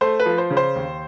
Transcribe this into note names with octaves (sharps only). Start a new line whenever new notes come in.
A3 C5
B4
F3
C5
C#3
C5
D#2